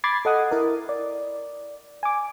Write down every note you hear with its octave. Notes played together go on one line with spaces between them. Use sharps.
B5 D6 G#6 A6 C7
A4 D#5 F#5 D#6
E4 A#4
D5
G#5 D6